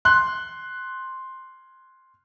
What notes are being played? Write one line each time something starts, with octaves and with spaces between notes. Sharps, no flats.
C6 F#6